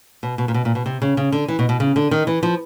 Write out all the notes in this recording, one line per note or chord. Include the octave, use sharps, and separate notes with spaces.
B2
B2
A#2
B2
A#2
B2
C3
C#3
C#3
D3
E3
B2
B2
C#3
D3
D#3
E3
F3